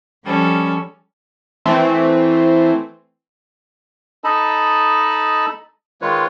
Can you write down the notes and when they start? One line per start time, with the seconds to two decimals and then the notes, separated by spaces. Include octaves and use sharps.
0.25 F3 G3 C#4 A4
1.65 E3 A3 C4
4.24 D#4 A4 D#5 A5 B5
6.02 D#3 G#3 F4 B4 C#5